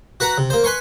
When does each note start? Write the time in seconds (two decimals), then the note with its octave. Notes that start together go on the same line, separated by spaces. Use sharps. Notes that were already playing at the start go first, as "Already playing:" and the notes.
0.20 F#4 B4 F#5 A#5
0.38 C3
0.50 A#3 C5
0.64 B4 G#5 C6 C#6